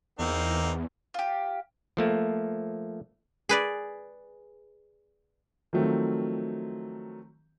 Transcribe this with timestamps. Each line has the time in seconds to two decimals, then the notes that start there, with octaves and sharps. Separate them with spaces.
0.19 E2 A#3 C4 D#4
1.14 F4 G4
1.97 F3 A3 A#3
3.49 G#4 B4 D5
5.73 D#3 F3 F#3 A3 C4